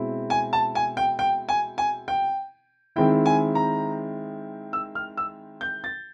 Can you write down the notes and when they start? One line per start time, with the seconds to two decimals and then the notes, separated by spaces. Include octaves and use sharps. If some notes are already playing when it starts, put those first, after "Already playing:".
Already playing: B2 G#3 C4 E4
0.30 G#5
0.53 A5
0.75 G#5
0.97 G5
1.19 G5
1.49 G#5
1.78 G#5
2.08 G5
2.96 D#3 G#3 C4 E4 G5
3.26 G#5
3.55 A#5
4.73 E6
4.95 F6
5.17 E6
5.61 G6
5.84 A6